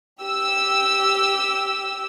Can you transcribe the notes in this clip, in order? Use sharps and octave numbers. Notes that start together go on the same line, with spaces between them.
G4 E6